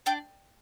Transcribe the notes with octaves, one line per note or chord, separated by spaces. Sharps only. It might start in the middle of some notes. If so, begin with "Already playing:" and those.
D4 G5